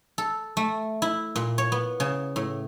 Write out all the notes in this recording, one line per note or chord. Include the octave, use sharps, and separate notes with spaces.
A4
A3
E4
A#2
C#5
B3
C#3
A2